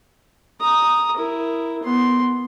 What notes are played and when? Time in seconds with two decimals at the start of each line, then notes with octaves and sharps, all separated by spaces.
0.61 A#5 D#6
1.17 E4 A#4
1.83 B3 C6